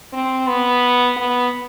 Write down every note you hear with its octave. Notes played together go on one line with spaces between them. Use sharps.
C4
B3
B3